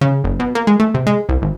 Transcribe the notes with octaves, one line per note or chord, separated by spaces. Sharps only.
C#3
F#1
B2
A#3
G#3
A3
C3
G#3
C2
G#1